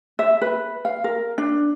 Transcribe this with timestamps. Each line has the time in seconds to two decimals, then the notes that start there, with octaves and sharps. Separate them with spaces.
0.19 E5
0.42 B4
0.85 F5
1.04 A#4
1.38 D4